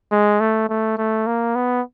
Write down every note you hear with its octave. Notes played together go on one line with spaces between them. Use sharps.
G#3
A3
A3
A3
A#3
B3